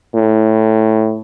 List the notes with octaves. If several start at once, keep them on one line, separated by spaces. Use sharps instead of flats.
A2